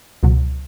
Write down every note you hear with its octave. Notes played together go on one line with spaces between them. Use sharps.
C#2 B2 F#3